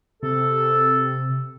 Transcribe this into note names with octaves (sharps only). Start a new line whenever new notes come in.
C3 A4